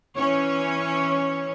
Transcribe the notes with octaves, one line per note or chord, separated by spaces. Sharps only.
E3 C#4 C#5